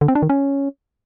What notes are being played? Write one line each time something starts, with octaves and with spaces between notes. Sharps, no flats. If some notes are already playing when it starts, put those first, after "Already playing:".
D3
C4
D4
D#3
C#4